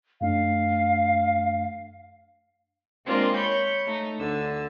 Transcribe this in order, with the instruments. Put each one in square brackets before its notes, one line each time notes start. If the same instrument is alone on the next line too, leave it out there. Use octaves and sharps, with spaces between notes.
[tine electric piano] F#2 A3 D4 [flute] F5
[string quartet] G#3 A#3 C4 D4 F4 A#4
C#5 B5 C#6 G6
A3 D#4
D2 D3 E6